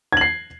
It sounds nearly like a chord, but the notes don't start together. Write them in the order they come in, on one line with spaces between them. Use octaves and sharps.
G#6 F#7 C7